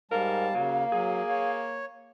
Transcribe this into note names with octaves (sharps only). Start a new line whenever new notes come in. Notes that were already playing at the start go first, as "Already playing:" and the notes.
G#2 G3 A#4 F5 A5
C#3 F#3 A#3
F#3 G#4
C#5